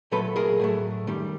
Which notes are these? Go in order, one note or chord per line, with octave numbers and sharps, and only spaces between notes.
A#2 F#3 A3 A4 B4
G#4 A#4
A2 F#3 A3
F#2 D#3 G3